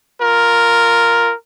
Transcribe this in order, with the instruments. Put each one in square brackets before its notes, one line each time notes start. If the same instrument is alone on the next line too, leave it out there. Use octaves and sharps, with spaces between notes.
[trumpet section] F4 A#4